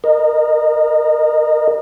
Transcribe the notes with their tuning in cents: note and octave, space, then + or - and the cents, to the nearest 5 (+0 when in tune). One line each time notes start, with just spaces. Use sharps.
A#4 +0 D#5 -25